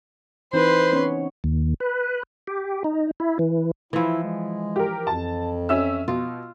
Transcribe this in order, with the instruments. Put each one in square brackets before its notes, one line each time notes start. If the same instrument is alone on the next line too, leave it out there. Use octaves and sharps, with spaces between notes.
[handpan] E3 C4 D#4 [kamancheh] B4 C6 [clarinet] C5
[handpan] B3 C#4 C#5
[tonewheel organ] D#2
B4
G4
D#4
E4
E3
[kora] E3 F3 [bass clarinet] E4
[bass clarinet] G#3
[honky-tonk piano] G4 A#4
[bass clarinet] F2 [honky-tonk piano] A5
[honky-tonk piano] C#4 E5 E6
[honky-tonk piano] B2 [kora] F4